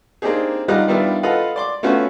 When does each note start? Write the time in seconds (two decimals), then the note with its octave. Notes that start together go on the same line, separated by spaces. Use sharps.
0.22 A#3 C4 D4 D#4 G4 G#4
0.68 G3 D#4 F4 D#5 F#5 F#6
0.88 D#3 G3 B3 D4 E4 F4
1.23 F4 A4 B4 D#5 F5 F#5
1.56 D5 C6 D6
1.83 A3 B3 C#4 F4 F#4